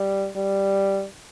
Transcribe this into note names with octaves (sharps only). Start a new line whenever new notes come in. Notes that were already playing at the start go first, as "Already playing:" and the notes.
Already playing: G3
G3